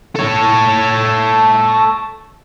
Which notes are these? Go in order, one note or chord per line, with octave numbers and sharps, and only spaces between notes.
A4 C#5